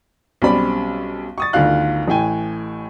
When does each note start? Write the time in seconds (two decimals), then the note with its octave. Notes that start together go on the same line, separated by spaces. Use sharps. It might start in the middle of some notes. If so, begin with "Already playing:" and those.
0.42 B1 G3 C4 C#4 D5 B5
1.38 C#6 D#6 A6
1.53 G1 D2 D#3 F4 F5 F#6
2.08 A1 A2 G5 G#5